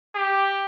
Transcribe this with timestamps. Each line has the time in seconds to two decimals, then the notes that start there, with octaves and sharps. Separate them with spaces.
0.15 G4